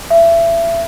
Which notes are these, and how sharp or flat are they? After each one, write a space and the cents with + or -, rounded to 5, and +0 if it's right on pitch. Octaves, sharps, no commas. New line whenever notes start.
E5 +25